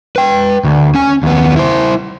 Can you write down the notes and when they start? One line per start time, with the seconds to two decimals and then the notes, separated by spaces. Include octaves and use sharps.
0.16 B4 G5
0.64 D2
0.94 C#4 G#5
1.23 D#2 B3
1.56 E4 C5